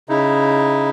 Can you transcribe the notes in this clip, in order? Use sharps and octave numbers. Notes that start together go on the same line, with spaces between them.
C#3 D#4 E4